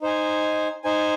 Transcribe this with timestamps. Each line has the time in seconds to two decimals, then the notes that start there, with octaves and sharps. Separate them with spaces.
0.02 D#4 C5 G#5
0.84 D#4 C5 G#5